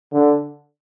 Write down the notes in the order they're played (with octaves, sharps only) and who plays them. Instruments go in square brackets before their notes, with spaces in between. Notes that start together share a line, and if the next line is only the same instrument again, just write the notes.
[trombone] D3